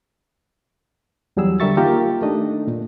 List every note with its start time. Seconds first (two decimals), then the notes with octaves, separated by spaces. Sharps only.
1.37 E2 F#3 G3 G#4 E6
1.60 D3 G3 A#4 E5 C#6 A6
1.77 D#3 A#3 F4 G4 A#4 A#5
2.22 A3 D4 D#4 D#5
2.67 A#2